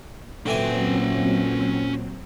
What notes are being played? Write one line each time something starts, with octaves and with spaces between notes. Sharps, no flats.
A#2 D3 E3 F#3 C4 C#4 G5 G#5